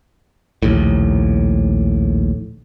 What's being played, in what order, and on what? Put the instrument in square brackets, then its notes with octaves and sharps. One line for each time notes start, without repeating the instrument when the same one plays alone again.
[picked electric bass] A#1 D#2 A2